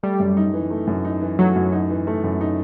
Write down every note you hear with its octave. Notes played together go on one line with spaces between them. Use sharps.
G3 A3
F#2
D#4
E3
A3
F#2
D#4
E3
F#3 A3
F#2
D#4
E3
A3
F#2
D#4